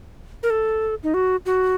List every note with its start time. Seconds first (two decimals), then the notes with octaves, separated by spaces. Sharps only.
0.43 A#4
0.50 A4
1.03 D#4
1.14 F#4
1.46 F#4